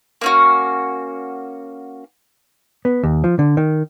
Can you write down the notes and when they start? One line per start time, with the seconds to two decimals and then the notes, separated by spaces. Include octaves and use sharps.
0.21 A#3 C#4 F#4
2.85 B3
3.03 D#2
3.24 F3
3.39 D3
3.57 D#3